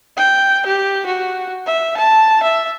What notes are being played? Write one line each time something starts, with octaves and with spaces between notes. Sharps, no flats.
G5
G4
F#4
E5
A5
E5